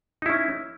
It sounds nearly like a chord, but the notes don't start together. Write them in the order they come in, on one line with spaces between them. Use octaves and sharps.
D#4 E4 C#4